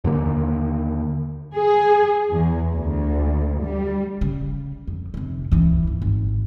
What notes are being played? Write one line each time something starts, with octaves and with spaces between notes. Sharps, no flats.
D#2 D3 A#3
G#4
E2
D2
G3
C#3
F2
F1 C3
C#2 E3
G#1
G#1